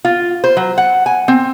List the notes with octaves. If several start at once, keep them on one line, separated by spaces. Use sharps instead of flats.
F4
C5
F#3
F#5
G#5
C4